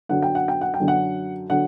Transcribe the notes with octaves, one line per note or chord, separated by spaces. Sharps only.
F#2 D3 F#3 F#5
G5
F#5
G5
F#5
G5
F#2 D3 F#3
F#5
D3 F#3 F#5